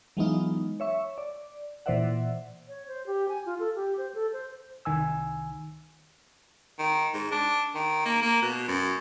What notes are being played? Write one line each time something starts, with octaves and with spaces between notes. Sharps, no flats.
E3 F#3 G#3 B3 D#4 F4
C#5 E5 C#6
D5
A#2 E3 C5 D5 E5 F#5
C#5
C5
G4
G#5
F4
A4
G4
C5
A4
C5
C2 D#3 G#5 E6
D#3
G#2
D4
D#3
A#3
A#3
B2
F#2